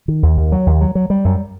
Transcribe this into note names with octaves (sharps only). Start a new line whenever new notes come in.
D#3
D#2
D#2
F#3
D#2
F#3
F#3
G3
F#2